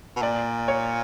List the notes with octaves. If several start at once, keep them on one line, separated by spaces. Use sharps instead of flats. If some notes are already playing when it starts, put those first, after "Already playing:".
B2
A#2 D5
C#5